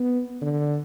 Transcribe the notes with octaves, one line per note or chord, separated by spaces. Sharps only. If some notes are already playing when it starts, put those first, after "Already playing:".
Already playing: B3
D3